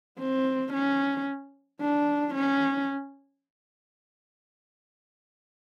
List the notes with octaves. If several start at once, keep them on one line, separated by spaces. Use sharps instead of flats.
C4
C#4
D4
C#4